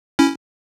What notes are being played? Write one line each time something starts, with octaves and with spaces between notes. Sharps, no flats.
C#4 E4